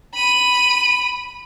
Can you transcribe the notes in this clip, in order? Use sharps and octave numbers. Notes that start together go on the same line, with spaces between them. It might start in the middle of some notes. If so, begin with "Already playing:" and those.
B5 D#7